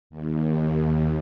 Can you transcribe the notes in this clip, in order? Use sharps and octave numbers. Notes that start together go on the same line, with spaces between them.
D#2